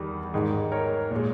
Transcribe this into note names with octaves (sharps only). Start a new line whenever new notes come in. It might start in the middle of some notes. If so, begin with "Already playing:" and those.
Already playing: E2 D#3 G3
G#2 D#3 G#3
A#4 C#5
A#2 G#3